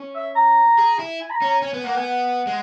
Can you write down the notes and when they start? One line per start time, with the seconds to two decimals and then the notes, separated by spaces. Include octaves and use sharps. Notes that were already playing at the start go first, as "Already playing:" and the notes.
Already playing: C#4
0.15 E5
0.36 A#5
0.78 G#4
0.99 E4
1.21 G#5
1.30 B5
1.35 A#5
1.42 C#4
1.48 A#5
1.62 C#4 G#5
1.74 B3
1.84 A#3 F#5
1.95 B3 G#5
2.04 F#5
2.47 G#3